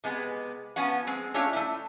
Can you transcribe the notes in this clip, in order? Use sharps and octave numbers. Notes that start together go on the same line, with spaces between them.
C3 G#3 B3
F3 B3 C#4 F#5
G#3 C4
A3 C#4 D4 F4 C#5 F5
A3 E4